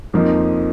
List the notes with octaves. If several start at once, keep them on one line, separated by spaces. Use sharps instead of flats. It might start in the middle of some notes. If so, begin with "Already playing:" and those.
F2 F3 A#3 D#4